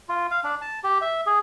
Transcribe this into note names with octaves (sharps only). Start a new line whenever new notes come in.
F4
F5
D4
A5
G4
E5
G#4